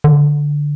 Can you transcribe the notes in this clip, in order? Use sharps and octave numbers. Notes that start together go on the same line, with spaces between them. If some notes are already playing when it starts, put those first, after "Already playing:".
D3